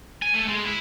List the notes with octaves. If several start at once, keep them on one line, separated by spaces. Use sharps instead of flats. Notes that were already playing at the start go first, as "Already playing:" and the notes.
G#5
A3
G#3
E4